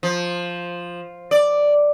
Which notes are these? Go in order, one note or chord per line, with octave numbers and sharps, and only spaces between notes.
F3
D5